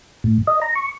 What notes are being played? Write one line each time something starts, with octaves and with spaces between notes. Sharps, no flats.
A2
D#5
A#5
C#6